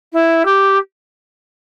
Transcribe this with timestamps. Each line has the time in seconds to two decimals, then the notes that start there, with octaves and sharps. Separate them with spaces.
0.13 E4
0.45 G4